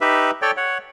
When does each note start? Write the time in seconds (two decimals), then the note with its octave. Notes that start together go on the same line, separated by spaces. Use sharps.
0.01 D#4 G4 B4 E5
0.42 A4 C#5 D5 G5
0.57 C#5 F#5